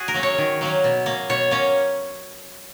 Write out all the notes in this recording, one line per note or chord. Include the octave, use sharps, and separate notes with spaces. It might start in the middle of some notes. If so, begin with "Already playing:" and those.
Already playing: F#4 G#4
A#4
F#3 A#3 C#4
C#5
D#3
F#3 A#3 C#4
B2
A#3 C#4
B2 C#5
A#3 C#4